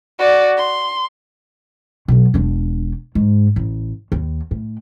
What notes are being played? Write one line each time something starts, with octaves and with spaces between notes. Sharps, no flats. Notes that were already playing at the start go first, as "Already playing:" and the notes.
F#4 D5
C6
B2 F#3
E1 D4
G#2
A1
D#2
A2